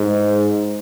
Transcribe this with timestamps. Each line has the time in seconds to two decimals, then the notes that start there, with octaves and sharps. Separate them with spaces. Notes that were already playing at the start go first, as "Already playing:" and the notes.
Already playing: G#2